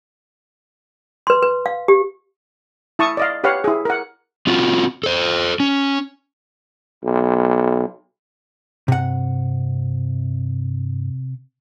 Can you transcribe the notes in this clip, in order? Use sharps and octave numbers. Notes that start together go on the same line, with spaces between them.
B4 C6
B4
F5
G4
E4 A5 C#6 D#6
D5 D#5 F5
G4 B4 C#5 F5 F#5
E4 G#4
A#4 F#5
C4 F4 F#4
A4 C5
C#4
B1
G2 C3 F#5